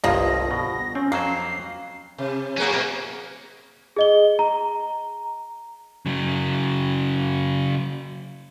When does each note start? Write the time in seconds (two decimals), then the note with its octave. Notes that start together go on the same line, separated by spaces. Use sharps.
0.04 G1 C2 G2 F3 A#3 D#5 A#6
0.51 B2
0.95 C4 C#4
1.12 F2 F#3 A#3 C5 C7
2.18 C3
2.58 F#3 A#3 B3 C#4 G#4
2.70 B2 G4
3.96 G#4 D#5 G7
4.39 A#5
6.06 C#3 F#3